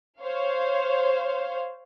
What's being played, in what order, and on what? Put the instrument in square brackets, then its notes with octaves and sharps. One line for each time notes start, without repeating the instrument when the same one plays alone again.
[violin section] C5 C#5 F5